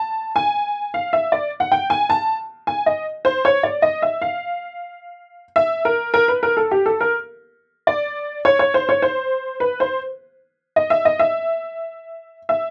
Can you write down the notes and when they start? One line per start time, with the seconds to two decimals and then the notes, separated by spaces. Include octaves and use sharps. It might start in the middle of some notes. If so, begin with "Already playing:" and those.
Already playing: A5
0.36 G#5
0.94 F5
1.13 E5
1.32 D5
1.60 F#5
1.72 G5
1.90 G#5
2.10 A5
2.67 G#5
2.86 D#5
3.25 C5
3.45 C#5
3.63 D5
3.82 D#5
4.02 E5
4.22 F5
5.56 E5
5.85 A#4
6.14 A#4
6.28 B4
6.43 A#4
6.57 A4
6.71 G4
6.86 A4
7.01 A#4
7.87 D5
8.45 C#5
8.59 C#5
8.74 C5
8.89 C#5
9.02 C5
9.60 B4
9.80 C5
10.76 D#5
10.90 E5
11.05 D#5
11.19 E5
12.49 E5